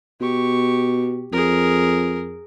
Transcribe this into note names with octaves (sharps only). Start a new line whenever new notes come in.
B2 G4 C#6
F2 G#4 A#4